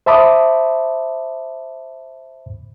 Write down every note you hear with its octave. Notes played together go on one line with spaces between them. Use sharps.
C5 E5 A5 B5 D6 D#6